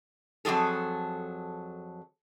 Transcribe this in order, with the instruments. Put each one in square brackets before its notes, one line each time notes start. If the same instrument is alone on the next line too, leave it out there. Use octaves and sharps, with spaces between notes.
[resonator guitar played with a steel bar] F2 B2 F#3 G#4 A4